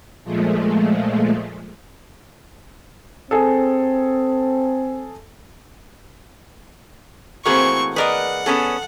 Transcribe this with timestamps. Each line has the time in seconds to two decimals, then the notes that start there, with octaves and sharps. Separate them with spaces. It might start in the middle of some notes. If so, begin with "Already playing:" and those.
0.24 A#2 F3 G#3 A3
3.31 C4 G#4 A4
7.45 A2 E3 A#3 C4 F#4 G#4 C#6
7.96 G#4 A#4 B4 D5 D#5 F#5
8.46 B3 C#4 G#4 A4